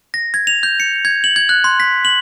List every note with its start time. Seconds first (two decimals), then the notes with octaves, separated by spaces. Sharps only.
0.14 A#6
0.34 G#6
0.47 F7
0.63 G6
0.80 C#7
1.05 G#6
1.24 F#7
1.36 G#6
1.49 F#6
1.64 C6
1.80 B6
2.05 F#7